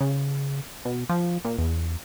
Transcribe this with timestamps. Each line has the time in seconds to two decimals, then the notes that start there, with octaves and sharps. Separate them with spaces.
0.01 C#3
0.85 B2
1.09 F3
1.45 A#2
1.58 E2